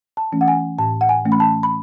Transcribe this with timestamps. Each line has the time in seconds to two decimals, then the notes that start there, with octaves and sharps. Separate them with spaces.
0.17 A5
0.32 E3 A3 C#4
0.41 F#5
0.48 G#5
0.78 A2 A5
1.01 F#5
1.09 G#5
1.25 E3 A3 C#4
1.32 B5
1.40 A5
1.63 B5